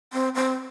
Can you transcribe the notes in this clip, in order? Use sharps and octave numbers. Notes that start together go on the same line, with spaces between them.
C4
C4